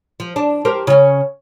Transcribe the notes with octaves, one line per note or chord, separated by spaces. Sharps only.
F3
D4
G4 A#4 C5
C#3 C#4